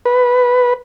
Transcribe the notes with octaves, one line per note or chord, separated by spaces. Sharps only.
B4